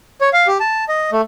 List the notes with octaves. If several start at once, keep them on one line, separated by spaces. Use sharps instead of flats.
C#5
F5
G4
A5
D#5
A3